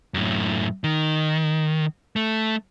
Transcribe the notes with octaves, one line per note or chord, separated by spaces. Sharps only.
F#2 A2
D#3
A3